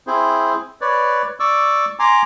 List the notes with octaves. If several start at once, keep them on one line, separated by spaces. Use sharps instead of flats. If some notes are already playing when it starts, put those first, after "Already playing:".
C4 E4 G#4 C5
B4 C#5 D5
D5 C#6 D6 E6
G#5 A#5 C6 D6